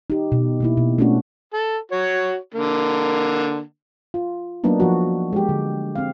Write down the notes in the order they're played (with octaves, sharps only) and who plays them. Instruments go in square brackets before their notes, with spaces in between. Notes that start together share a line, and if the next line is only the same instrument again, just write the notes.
[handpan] D#4 G4
B2
B2 A#3 E4
B2
A3 A#3 C#4 D4 F#4
[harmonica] A4
F#4 C#5
D3 A#3
[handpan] F4
F#3 A#3 B3 D4 D#4
F3 F#4
G#3 G4
D3
C4 F5